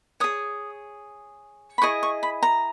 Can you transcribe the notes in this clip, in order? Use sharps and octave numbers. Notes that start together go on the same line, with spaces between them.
G#4 C#5 D#6
B5
E4 G#4 D#5 C#6
C#6
B5
A#5